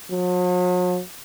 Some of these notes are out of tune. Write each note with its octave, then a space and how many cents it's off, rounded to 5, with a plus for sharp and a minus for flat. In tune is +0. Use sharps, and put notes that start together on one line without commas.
F#3 -45